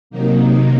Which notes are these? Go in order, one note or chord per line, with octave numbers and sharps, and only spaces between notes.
C3 D#3 F#3 A#3 D#4